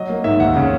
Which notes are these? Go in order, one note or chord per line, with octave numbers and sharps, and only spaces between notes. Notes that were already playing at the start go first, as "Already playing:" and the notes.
Already playing: F#3 D#5
A#3
G#2 E5
D#2 F#5
C#3